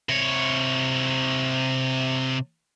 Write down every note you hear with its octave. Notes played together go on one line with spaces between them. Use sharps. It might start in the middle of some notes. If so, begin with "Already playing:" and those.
C3 C#5